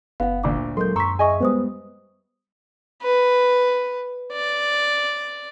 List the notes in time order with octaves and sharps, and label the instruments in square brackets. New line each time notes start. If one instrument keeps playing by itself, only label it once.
[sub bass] F#1 [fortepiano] B3 [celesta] F5 F#5
[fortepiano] D2 A#2 D4 [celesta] D6
[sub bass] F#3 [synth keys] G#3 C6 [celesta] A4 A#4 G6
[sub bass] F#2 [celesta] A#5 B6 [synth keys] C6 C#6 E6
[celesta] G#4 C#6 [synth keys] D#5 E5 G#5
[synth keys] G3 G#3 B3 [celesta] B4 C5 D#6
[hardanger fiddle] B4
D5